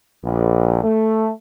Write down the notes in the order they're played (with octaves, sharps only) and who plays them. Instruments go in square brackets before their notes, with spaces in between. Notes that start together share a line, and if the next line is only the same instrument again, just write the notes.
[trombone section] A#1
A3